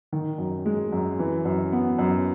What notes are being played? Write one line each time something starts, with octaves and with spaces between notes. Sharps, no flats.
D#3
F#2
G#3
F#2
E3
F#2
B3
F#2